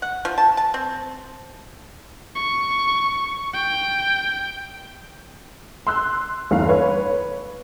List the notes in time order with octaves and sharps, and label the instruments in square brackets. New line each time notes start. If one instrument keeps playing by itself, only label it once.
[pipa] F#5
F3
A5
A5
C4
[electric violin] C#6
G5
[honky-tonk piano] C6 E6 F#6
G1 E2 A3 F5
B4 C#5